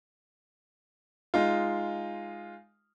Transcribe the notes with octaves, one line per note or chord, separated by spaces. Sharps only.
G#3 D#4 F4